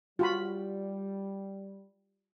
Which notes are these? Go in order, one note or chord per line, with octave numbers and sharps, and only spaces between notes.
G3 F4 F#4 B5